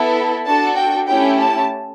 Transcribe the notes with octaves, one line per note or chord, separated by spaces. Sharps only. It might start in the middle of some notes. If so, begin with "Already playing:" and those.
Already playing: B3 E4 A4
D4 F#4 A4 A5
G5
A3 C#4 E4 G4 G5
A5